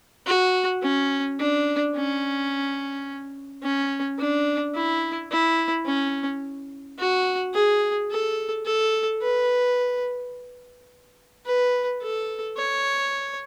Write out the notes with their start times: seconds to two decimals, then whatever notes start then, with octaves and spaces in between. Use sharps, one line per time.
0.27 F#4
0.83 C#4
1.39 D4
1.95 C#4
3.63 C#4
4.19 D4
4.74 E4
5.31 E4
5.86 C#4
6.98 F#4
7.54 G#4
8.11 A4
8.66 A4
9.22 B4
11.46 B4
12.02 A4
12.57 C#5